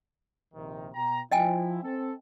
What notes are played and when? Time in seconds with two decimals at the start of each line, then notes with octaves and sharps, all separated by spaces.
0.54 A#1 C3 D#3
0.94 B2 G5 A#5
1.32 F3 E4 D#5 G5 G#5
1.83 C4 A4